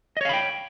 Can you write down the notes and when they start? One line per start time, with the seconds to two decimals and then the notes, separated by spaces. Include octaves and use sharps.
0.17 D#5
0.21 C#5
0.25 F5
0.29 B5
0.33 G5